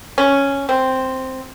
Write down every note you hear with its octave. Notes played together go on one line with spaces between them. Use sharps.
C#4
C4